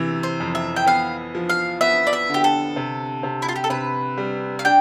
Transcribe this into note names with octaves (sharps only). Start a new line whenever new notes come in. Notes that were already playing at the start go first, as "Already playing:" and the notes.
Already playing: C3 E3
C5
F2
E5
G5
B3 F5
F3
F5
B3 E5
D5
E5
D3 G4
A4
C3
C3
E4
F4
G4
A4
C3 B4
G3
F5
D4 G5